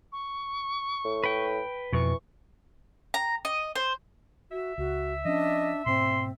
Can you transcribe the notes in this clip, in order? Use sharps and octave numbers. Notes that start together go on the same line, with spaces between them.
C#6
A2
B4 G5
F2 B2 E3 C#6
A#5
D#5
C5
F#4 E5
C#2 F#4
F3 C#4 D4 D#5
G#2 B2 C4 C6